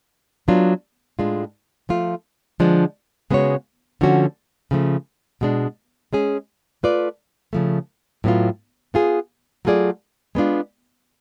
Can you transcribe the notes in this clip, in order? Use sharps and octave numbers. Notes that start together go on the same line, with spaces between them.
F#3 B3 D4 F4
A2 G#3 D4 F4
F3 A3 F4
D3 F3 G#3 D4
C#3 G#3 B3 F#4 C#5
D3 F3 A3 C#4 F#4
C#3 F3 A3
B2 G#3 D4
G#3 C#4 G#4
A3 F4 B4 D5
C#3 F3 A3
A2 F#3 B3 F4
B3 F4 G#4
F#3 A3 F4 G#4 D5
G#3 B3 D4 F4